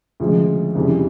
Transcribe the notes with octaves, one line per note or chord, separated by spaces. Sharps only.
D2 C#3 F3 G#3 F4
F2 C#3 E3 G3